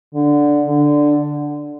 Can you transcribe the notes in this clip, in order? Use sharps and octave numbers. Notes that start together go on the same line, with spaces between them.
D3
D3